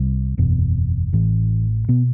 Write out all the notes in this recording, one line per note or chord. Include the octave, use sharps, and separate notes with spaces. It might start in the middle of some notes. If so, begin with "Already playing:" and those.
Already playing: C2 C3 G3
F#1 E2 B2
A1 A2 E3
B2 B3